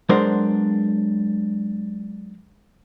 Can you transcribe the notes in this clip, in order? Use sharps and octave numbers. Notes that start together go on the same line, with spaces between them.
F#3 G#3 B3 D4 A#4 C5